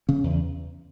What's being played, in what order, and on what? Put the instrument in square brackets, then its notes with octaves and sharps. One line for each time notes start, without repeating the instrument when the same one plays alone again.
[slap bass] C#3 C#4
E2